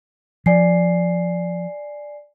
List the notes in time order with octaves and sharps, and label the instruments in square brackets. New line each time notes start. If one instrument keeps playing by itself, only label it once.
[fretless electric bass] F3 [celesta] D5 G#5 C7